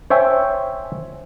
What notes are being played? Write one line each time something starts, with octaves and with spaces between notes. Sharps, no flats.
C5 C#5 E5 G5 G#5